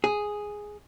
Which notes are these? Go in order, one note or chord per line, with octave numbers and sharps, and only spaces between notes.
G#4